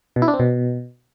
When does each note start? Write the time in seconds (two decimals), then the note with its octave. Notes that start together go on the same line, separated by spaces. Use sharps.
0.16 B2
0.22 E4
0.28 D4
0.34 C4
0.40 B2